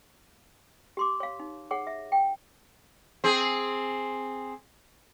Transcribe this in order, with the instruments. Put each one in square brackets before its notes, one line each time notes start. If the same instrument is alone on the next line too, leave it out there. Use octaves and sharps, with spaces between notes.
[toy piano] G4 C6 D6
C#5 F5
D#4
G#4 C#5 F#5
E5
G5
[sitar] C4 G#4